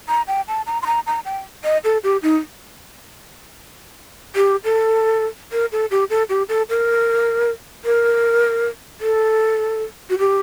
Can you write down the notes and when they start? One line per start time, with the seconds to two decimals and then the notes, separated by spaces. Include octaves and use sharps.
0.08 A#5
0.28 G5
0.48 A5
0.67 A#5
0.82 C6
0.87 A#5
1.06 A#5
1.25 G5
1.64 D#5
1.84 A4
2.04 G4
2.23 D#4
4.36 G4
4.64 A4
5.52 A#4
5.72 A4
5.91 G4
6.10 A4
6.29 G4
6.49 A4
6.69 A#4
7.85 A#4
9.01 A4
10.10 F#4
10.18 G4